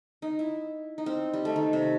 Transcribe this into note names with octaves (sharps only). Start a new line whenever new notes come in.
D#4
E4
D#4
C4
G3
A3
D#3
C3